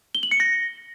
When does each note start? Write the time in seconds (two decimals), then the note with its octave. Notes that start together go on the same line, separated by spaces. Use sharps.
0.15 G7
0.23 F#7
0.31 C#7
0.40 A#6